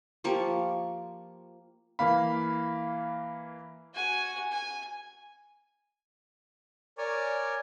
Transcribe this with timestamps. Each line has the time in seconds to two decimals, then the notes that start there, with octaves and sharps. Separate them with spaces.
0.24 F3 A#3 G4 C#6
1.99 E3 A#3 F5 B5
3.94 F#4 G#5
4.51 G#5
6.98 A#4 C#5 D5 G#5